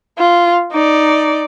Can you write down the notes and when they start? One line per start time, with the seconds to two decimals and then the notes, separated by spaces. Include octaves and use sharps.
0.19 F4
0.72 D#4 D5